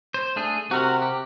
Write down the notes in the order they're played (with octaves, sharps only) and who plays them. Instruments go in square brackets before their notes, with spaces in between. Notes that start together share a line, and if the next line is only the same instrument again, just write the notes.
[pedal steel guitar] C5
A3 D4 G#4
[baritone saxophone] C3 [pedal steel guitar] F#4 A#4 F#5
[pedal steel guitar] G4